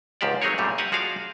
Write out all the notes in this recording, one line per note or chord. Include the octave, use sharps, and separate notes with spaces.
C#2 G#2 F3 G4 C5 D5
F#3 C4 D#4 G#4 A#4 C#5
F#2 A#2 G3 A3
G4 D#5 F5 F#5 G#5
F3 F#4 G#4 D5 F5